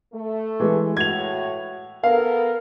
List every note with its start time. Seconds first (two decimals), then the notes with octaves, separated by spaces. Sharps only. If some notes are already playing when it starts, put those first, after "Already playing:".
0.14 A3
0.60 E3 G#3
0.97 A2 F#4 G#6 F7
2.04 B3 A4 A#4 F5